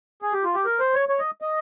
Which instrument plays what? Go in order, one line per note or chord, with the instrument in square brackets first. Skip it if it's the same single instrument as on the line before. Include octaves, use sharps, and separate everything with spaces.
[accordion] G#4
G4
F4
G4
A#4
C5
C#5
C#5
D#5
D#5